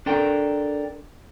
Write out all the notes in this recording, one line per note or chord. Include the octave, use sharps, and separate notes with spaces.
D4 A4 A#4 G5